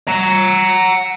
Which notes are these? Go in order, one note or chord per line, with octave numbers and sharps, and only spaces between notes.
F#5 A#5